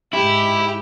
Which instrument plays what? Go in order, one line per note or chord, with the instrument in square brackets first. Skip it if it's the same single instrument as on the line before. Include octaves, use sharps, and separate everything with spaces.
[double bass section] G#2 [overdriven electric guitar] E4 [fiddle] G4